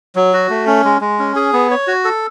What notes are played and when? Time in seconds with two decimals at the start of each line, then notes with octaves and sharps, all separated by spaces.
0.16 F#3
0.33 F#4
0.50 A3
0.67 C#4
0.84 G#3
1.01 G#3
1.19 C#4
1.36 G#4
1.53 B3
1.71 C#5
1.87 F#4
2.05 A4